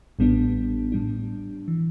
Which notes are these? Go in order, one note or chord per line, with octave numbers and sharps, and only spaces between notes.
A1 A2 G3 B3 D4
A2 G3 D4
E3